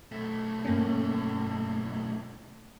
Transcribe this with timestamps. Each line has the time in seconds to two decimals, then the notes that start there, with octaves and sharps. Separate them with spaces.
0.12 B1 A3
0.65 G2 A#3 C#4